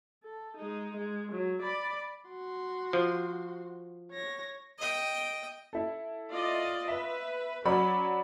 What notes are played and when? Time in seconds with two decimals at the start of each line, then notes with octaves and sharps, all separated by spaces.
0.24 A4
0.57 G#3 D#4
0.97 G#3
1.32 F#3
1.62 D5 B5
2.29 F#4 C6
2.93 F3
4.11 C#5 A#6
4.78 D#5 G5
5.73 E4 A4
6.30 F4 D5 D#5
6.88 B4 E5
7.65 F#3 C#4 D5 B5